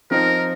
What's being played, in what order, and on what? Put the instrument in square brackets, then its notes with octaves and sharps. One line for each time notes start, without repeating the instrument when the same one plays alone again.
[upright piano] F3 C4 D#4 [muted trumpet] A#4